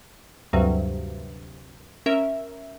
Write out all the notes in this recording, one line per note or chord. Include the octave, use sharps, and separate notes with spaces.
D2 G2 C3 F#3
C#4 A#4 E5